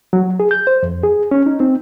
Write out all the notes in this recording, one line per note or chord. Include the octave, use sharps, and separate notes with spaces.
F#3
G#4
G6
C5
F2
G#4
C#4
D#4
C4